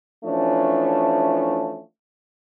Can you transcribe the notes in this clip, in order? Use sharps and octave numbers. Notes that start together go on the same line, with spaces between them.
E3 F3 A3 C#4 D4